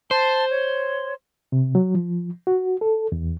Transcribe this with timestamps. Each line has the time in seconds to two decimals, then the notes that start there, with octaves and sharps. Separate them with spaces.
0.11 C5 A5
0.50 C#5
1.52 C3
1.75 F#3
1.95 F3
2.47 F#4
2.81 A4
3.12 E2